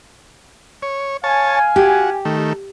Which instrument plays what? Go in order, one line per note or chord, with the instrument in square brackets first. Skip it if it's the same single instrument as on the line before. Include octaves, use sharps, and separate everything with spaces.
[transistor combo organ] C#5
[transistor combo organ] C#5 A5 [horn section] F5 G#5
[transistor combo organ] F#4 [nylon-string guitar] G4
[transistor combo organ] D#3 A3